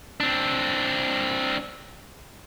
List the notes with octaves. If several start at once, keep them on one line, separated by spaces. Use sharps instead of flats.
C4 D4